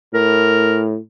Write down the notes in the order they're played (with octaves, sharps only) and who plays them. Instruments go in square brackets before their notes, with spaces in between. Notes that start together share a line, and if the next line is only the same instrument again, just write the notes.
[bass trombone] A2 [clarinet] A#4